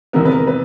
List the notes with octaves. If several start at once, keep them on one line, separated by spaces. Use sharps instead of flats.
E2 C3 D#3 G#3 B3 A#4
B4
A#4
B4